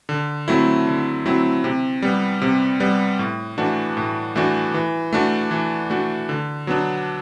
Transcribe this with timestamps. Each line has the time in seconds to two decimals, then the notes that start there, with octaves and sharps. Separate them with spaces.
0.09 D3
0.48 F#3 A3 C4 E4
0.87 D3
1.25 F#3 A3 C4 E4
1.64 C3
2.02 G3 B3
2.42 C3
2.80 G3 B3
3.19 A2
3.58 E3 A3 D4 F#4
3.97 A2
4.36 E3 A3 D4 F#4
4.74 E3
5.13 A3 D4 F#4
5.51 E3
5.90 A3 D4 F#4
6.29 D3
6.67 F#3 B3 D4